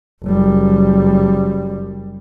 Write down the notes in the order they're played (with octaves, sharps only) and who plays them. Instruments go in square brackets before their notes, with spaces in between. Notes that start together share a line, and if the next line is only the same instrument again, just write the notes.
[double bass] F#1 G3